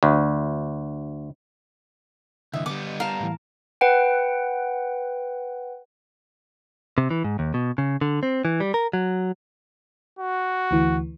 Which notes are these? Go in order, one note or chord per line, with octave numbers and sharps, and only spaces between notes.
D2
C2 D3 E3 D#5 E5
G3 B3 D6
A#4 F5 A5
A2 E3
B4 F#5 G5
C3
E3
G#2
D#2
B2
C#3
D3
C4
E3
G3
A#4
F#3
F#4
D2 E3